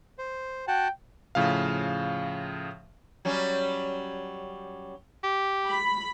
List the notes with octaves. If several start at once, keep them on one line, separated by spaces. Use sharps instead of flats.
C5
F#4 F#5 G5 A5
A2 C#3 F3 F5
F#3 G3 C#4
G4
B5